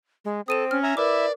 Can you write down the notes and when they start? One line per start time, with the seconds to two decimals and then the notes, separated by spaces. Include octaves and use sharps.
0.25 G#3
0.48 C4 A4 D#6 D#7 E7
0.71 C#4 F6
0.83 E5 G#5 A#5
0.97 E4 A#4 B4 D5 E5 D6